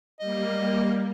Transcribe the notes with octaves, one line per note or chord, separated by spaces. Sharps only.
G3 A#3 D#5